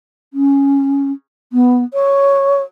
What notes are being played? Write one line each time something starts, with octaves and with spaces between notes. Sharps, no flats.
C#4
B3
C#5